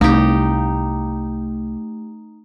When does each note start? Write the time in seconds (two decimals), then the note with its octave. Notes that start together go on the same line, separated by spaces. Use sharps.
0.01 C2 A3 D#4 G4